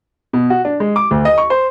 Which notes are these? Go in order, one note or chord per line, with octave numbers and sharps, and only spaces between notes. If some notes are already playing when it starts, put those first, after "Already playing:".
B2
F#4
D4
G#3
D6
D2
D#5
C#6
C5